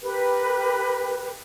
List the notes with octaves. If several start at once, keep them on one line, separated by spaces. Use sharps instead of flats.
G4 A#4 B4